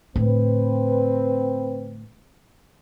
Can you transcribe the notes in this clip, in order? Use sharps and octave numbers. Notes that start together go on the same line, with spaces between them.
A2 D3 C4 B4